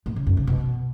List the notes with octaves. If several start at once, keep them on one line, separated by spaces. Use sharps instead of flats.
A#2
C#3
F#2
C#3
B2